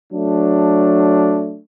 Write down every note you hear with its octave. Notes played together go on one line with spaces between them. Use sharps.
F#3 A3 D4